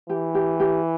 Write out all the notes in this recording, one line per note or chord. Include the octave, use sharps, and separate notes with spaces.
E3 G4
G4
G4